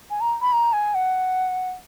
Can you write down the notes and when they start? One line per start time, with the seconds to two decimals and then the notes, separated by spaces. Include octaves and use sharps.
0.10 G#5
0.21 A#5
0.41 B5
0.53 A#5
0.73 G#5
0.94 F#5